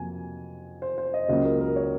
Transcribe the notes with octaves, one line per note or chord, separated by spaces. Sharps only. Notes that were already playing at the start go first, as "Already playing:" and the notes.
Already playing: F2 C3 F#3 A#3 G#5
C5
C5
D#5
C#2 C#3 F#3 A#3 D#5
A#4
A#4
C#5